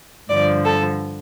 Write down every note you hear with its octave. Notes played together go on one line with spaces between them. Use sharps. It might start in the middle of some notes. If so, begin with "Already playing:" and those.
G2 D3 F3 D5
A4